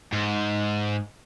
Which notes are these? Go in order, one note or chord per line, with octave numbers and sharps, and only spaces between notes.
G#2